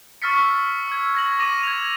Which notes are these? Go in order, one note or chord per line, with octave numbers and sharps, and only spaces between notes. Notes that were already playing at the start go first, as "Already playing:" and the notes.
C#6 E6 F6 A6 B6 C#7
E6 G#6
G#6 A#6 F#7
D6 A#6 D#7
G#6 F7